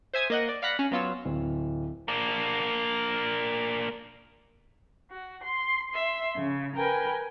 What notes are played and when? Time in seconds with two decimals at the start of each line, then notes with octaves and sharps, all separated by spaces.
0.14 C5 E5 G#5 D#6 G#6
0.30 A#3 D#5 F#5
0.49 D5
0.62 D5 F5 F#5 B5 F#6 A#6
0.79 C#4
0.91 F#3 B3 F4 C#5 E6
1.25 D1
2.08 A#3 D4
5.11 F#4
5.45 C6
5.91 E5 C6
6.37 C#3
6.76 A#4 B4 G5 G#5